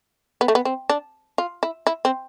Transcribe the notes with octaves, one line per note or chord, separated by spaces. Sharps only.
B3
A3
B3
C4
D4
F4
E4
E4
C4